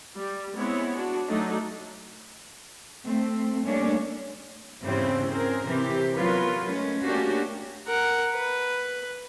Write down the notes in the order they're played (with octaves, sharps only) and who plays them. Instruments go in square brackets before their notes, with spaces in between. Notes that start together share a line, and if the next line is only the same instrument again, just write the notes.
[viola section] G3
G#3 B3 C4 E4 C#5
D4 F#4
F#3 A3 D4 D#4
[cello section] A3 C4
G3 A3 A#3 C#4 D4
E2 G#2 C#3 C4 E4 G4
C4 G#4 A#4
C3 E3 C4 G4
F#3 B3 F4 A#4 B4 C#5
G#3 A3 C#4
A3 A#3 C#4 D4 F#4 G4
[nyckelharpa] A#4 F#5
B4